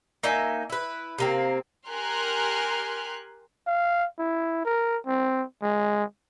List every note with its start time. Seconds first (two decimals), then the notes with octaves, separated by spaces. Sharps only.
0.23 A#3 D#4 E5 G#5
0.70 E4 B4
1.19 C3 A#3 C4
1.88 G4 A#4 G#5 C6 F6 F#6
3.67 F5
4.19 E4
4.65 A#4
5.07 C4
5.62 G#3